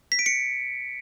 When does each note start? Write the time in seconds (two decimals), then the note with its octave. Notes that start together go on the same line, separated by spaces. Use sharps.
0.12 B6
0.19 D7
0.26 C#7